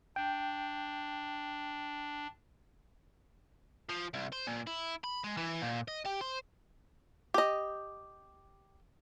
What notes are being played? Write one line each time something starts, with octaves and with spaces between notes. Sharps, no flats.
D4 G5
F3
C2
C5
A#2
E4
B5
G#3
E3
A#2
D#5
G4
C5
G4 D#5